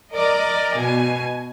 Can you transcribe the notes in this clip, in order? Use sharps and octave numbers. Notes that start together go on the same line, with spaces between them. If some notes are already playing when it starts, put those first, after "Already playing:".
A#4 D5 D#5
B2 G#5